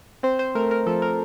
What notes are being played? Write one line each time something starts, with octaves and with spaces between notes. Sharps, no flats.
C4 C5
C5
A3 A#4
A#4
F3 A4
A#4